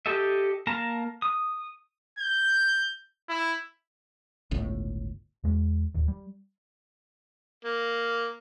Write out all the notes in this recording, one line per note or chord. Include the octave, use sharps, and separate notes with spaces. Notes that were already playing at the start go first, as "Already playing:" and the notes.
G4 A4 D#5 E5
A#3 A#4 A5 A#5
D#6
G6
E4
G1 C#2 A2
E2 G#3
D1 D#2
G3
A#3